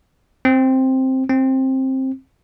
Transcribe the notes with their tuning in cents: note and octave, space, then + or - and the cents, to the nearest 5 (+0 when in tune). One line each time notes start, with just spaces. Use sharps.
C4 +5
C4 +15